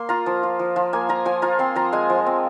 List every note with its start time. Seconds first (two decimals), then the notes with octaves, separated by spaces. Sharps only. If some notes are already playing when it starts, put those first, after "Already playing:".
Already playing: A#3 C6
0.09 F4 A#5
0.26 F3
0.43 F4
0.59 F3
0.76 F3
0.93 A#3 G#5
1.09 F4 A#5
1.25 F3 G#5
1.42 F4 A#5
1.59 C4 C6
1.76 F3 A#5
1.92 G#3 G#5
2.10 F3
2.26 C4